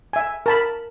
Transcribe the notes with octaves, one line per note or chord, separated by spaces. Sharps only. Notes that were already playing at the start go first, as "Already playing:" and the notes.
E5 G#5
A#4 A5 B5